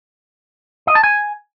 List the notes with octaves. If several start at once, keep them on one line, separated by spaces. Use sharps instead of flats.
D#5
A5
G#5